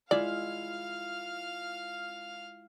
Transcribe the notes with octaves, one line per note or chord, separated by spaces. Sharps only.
G#3 E4 F4 D5 F5 F6